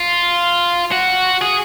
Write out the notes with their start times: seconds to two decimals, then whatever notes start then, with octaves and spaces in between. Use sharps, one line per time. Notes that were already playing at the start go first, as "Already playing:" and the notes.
Already playing: F4
0.92 F#4
1.42 G#4